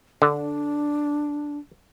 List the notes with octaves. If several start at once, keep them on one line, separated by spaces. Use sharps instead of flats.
D3 D4